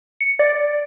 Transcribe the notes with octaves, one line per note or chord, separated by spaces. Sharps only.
C#7
D5